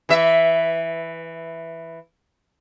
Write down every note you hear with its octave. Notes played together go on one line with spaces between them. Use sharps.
E3 E5